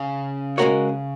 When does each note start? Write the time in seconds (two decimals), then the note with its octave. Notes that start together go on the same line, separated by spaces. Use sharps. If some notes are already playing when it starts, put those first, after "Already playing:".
Already playing: C#3
0.58 G#3 C#4 F#4 A#4 C#5